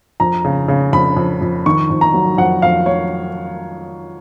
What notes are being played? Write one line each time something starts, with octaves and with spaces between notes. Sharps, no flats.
F2 A#5
C#3
C#3
F2 B5
F2
F2
D#3 C#6
F2
A#5
F#3
F2 F#5
F2 F5
F#3 C#5